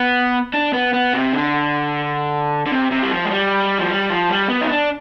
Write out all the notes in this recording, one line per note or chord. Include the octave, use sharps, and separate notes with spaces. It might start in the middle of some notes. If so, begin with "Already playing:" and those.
Already playing: B3
D4
B3
B3
C3
D3
D3
C3
C3
G3
F3
G#3
G3
F3
G3
F3
G3
B3
D#4
D4